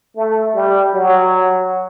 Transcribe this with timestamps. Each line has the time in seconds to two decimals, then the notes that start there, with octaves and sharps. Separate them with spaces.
0.16 A3
0.55 G3
0.94 F#3